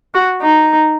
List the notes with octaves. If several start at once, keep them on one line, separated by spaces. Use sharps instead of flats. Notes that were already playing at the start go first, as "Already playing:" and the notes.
F#4
D#4